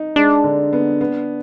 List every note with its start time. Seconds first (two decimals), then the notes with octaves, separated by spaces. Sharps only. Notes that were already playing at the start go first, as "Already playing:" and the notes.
Already playing: D#4
0.16 G#3 D4
0.44 D3
0.73 B3
1.01 B3